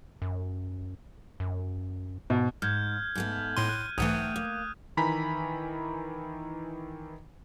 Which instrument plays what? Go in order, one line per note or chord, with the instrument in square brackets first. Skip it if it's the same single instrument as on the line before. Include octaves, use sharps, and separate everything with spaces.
[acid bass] F#2
F#2
[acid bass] G#2 [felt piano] B2
[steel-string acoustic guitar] G#2 [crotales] F6 G6 G#6
[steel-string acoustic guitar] G#2 A3 B3
[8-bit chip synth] A2 C6 [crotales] D#7
[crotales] F#6
[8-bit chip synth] B1 G#2 E3 [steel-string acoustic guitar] A3 F#5 G5 [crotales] D#6 D#7
[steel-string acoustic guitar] A#3
[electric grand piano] D#3 E3 G#5 A#5 B5 B6